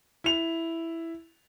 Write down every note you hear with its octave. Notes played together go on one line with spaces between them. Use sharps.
E4 F7